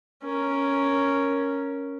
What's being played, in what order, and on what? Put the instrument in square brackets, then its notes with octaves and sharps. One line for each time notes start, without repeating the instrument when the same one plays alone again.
[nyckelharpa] C#4 A#4